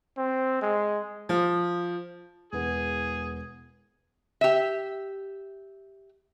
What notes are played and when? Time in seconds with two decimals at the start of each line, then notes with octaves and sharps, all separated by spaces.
0.17 C4
0.62 G#3
1.29 F3
2.53 E1 E3 B3 G#4
4.41 G4 E5